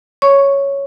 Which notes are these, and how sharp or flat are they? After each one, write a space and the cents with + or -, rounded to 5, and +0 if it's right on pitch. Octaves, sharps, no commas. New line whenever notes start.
C#5 +0 C#6 +0